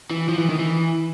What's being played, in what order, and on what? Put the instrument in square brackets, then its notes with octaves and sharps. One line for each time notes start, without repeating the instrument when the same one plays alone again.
[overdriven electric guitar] E3
F3
E3
D#3
E3